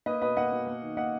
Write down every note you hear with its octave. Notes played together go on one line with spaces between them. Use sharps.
A#3 B4 D#5
B2 B4 D#5
A#3 D#5 F#5
B2
A#3
D#3
A#3 D#5 F#5